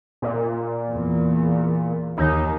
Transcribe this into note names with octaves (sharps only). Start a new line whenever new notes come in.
A#2
E2
D#2 D#3 D#4